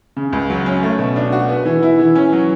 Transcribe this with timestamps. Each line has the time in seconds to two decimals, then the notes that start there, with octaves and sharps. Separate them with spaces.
0.17 C#3
0.33 C#2
0.50 F#3
0.66 C#4
0.83 A3
0.99 B2
1.16 D4
1.33 F#4
1.49 B3
1.65 E3
1.83 E4
1.99 E3
2.16 C#4
2.32 F#3